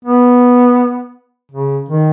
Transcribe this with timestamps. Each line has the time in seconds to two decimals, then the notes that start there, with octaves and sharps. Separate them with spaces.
0.05 B3
1.52 C#3
1.89 D#3